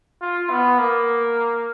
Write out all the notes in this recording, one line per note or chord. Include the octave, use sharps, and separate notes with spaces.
F4
B3
A#3